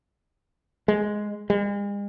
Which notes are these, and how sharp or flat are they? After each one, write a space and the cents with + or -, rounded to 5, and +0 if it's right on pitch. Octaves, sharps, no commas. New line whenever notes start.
G#3 +5
G#3 -45